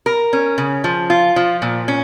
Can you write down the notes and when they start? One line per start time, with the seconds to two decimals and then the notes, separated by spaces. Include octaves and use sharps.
0.06 A#4
0.33 C#4
0.58 C#3
0.84 F3
1.10 F4
1.36 F3
1.62 A#2
1.88 C#4